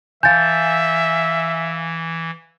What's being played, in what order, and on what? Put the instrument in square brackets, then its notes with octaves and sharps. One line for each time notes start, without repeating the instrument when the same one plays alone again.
[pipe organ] E3 [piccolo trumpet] E5 [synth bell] F5 G#5 [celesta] G6 A6